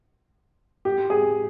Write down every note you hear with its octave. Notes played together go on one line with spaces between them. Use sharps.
G4
G#4